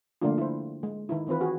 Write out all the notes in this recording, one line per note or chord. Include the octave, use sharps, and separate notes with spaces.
D3 F3 A3 A#3 D4 F4
E4 C5
G#3
D#3 D#4 E4
D#3 E3 C4 F4 B4
F#4 G#4